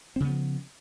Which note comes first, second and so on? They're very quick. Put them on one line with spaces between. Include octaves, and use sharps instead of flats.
C4 C#3 B3 F3